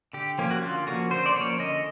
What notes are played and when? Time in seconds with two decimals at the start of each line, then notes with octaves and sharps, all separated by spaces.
0.13 D3 G4
0.38 F3 A#3 C#4
0.51 F#4
0.62 D3 F4
0.87 F3 A#3 C#4 F#4
1.11 D3 C5
1.26 D5
1.36 F3 A#3 C#4 C#5
1.59 D3 D#5